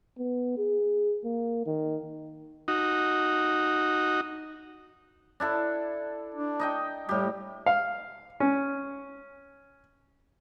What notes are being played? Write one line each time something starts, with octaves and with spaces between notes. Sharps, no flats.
B3
G#4
A#3
D#3
D#4 F#4
D4 E4 A4
D4
D#4 D#5 G5
A2 G3 G4
F5
C#4